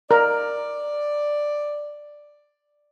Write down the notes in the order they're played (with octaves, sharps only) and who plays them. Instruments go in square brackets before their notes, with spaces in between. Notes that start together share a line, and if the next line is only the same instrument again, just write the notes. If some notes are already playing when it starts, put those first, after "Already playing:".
[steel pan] A#4 [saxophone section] D5